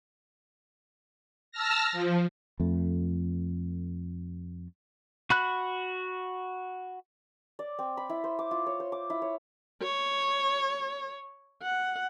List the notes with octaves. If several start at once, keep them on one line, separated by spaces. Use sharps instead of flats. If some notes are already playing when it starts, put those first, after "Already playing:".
A5 E6 F6 A#6
F3
F2 A3
F#4 B5 F#6
D5
C4
B5
E4
C5
D6
F4
C#5
C5
D6
E4
C#5
C#5
F#5